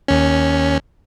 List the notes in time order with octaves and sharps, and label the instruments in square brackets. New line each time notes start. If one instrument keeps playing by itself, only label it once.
[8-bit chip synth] D#2 C#4